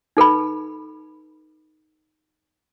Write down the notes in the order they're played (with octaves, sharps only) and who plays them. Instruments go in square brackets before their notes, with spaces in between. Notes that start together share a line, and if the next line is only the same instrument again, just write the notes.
[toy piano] D#4 A4 B4 B5